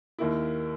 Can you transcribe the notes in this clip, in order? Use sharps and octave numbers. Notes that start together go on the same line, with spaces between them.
D#2 D#3 A#3 E4